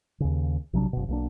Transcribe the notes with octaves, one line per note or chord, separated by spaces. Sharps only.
D#2 C#3
A#1 C3 F#3 D4
F#1 B2
B1 A#3 D4